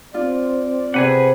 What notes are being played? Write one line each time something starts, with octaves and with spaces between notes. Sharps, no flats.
C4 F4 D5
C3 G#4 B4 F#5